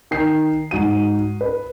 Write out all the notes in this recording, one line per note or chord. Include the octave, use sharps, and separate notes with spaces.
D#3 G5 C7
G#2 F#4 D#7
B4